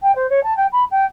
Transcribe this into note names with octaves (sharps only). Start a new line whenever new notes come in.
G5
C5
C#5
A5
G5
B5
G5